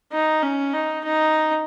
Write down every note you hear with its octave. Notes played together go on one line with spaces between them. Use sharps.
D#4
C#4
D#4
D#4